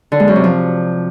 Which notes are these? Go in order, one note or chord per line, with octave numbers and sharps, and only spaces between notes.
D3
G#3
F#2
C3
F3